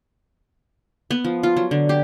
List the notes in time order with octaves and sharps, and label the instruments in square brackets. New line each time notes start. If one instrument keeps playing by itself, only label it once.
[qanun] B3
F3
F4
F#3
D3
G4